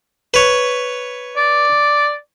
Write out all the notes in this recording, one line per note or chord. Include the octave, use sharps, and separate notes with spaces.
B4 C#5
D5